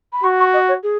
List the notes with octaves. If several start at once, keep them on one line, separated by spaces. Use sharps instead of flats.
B5
F#4 C#6
C#6
D#5
C#5
G#4